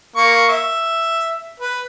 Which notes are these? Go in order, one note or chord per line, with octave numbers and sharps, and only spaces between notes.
A#3 C#6
E5
B4